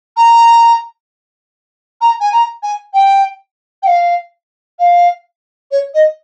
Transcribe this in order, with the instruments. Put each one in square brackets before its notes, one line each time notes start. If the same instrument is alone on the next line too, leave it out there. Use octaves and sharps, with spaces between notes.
[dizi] A#5
A#5
G#5
A#5
G#5
G5
G5
F5
F5
C#5
D#5